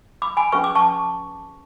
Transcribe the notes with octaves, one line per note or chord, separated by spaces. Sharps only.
B5 D6
G#5 B5
C#4 G#4 B4 C#6
D6
A5 C#6